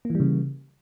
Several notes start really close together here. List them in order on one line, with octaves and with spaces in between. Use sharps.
A#3 E3 G3 C#3